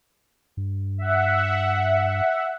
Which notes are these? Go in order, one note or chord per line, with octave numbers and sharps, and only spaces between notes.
G2
E5 F#5